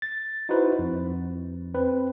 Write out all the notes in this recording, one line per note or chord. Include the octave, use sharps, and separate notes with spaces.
A6
D#4 E4 F#4 B4 C5
F2
C4 B4